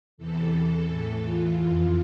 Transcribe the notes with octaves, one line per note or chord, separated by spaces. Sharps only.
E2 C3 E3 A4
E2 E3
A2 E3
E2 E3 F4
F2 E3 F4